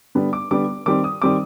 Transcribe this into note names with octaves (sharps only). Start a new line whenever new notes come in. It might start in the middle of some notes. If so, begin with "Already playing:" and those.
D3 G3 B3
D6
D3 G3 B3 D6
D#3 G3 C4 D6
D#6
D#3 G3 C4 D6